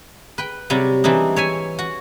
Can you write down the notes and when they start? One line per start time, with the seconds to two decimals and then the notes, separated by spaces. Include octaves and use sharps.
0.38 B4 G5
0.70 C3 F#3 G3
1.04 E3 C4 D4 D#4
1.36 C#5 E5 G#5
1.79 F#4